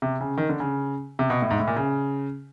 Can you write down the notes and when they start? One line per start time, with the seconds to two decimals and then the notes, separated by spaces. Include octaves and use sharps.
0.02 C3
0.20 C#3
0.37 D#3
0.49 D3
0.60 C#3
1.19 C3
1.30 B2
1.42 A2
1.50 G#2
1.59 A2
1.67 A#2
1.76 C#3